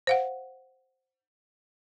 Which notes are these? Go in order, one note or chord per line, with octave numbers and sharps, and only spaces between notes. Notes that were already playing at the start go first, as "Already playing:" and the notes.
C5 F5 F#5